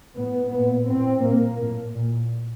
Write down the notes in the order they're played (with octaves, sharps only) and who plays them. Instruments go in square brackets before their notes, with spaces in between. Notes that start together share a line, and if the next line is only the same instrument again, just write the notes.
[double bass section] A2 B3
A#2 B3
A2 C4
A#2 A#3
A2
A#2